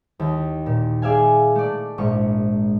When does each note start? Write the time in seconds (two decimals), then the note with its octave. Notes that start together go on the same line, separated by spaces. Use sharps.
0.20 D#2
0.66 A#2
1.02 G#4 D5 E5 F5 G#5
1.55 A3 D5
1.98 A#1 G#2 C#6